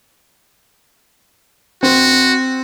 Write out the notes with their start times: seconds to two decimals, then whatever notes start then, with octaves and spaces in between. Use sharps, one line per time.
1.83 C4 F#4